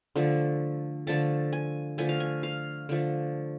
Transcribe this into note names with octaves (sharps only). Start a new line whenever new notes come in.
D3 F3 A3
D3 F3 A3 A5
G#5
D3 F3 A3 G#5
F5
G#5
F5
D3 F3 A3